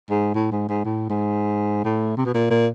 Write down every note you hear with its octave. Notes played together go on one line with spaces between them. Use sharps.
G#2
A2
G#2
G#2
A2
G#2
A2
C3
B2
A#2
A#2